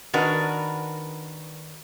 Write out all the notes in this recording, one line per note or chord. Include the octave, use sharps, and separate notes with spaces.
D#3 D4 F#4 A#4 B4